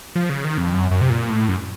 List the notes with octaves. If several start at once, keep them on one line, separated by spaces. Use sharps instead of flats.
F3
C#3
D#3
F2
F#2
F#2
C3
A#2
A2
F#2